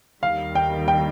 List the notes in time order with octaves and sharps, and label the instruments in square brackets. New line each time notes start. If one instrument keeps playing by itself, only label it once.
[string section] D#2 D#3 G3 [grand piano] F5
[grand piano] G5
G5